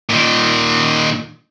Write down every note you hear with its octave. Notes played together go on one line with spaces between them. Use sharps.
A#2 D#3